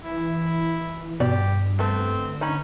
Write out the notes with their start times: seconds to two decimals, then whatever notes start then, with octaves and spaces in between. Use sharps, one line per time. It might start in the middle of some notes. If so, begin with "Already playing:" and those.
0.04 E3 E4
1.20 G2 B2 G4 D5
1.79 A3 B3 C4 A4
2.17 D3
2.41 C#4 D#4 B5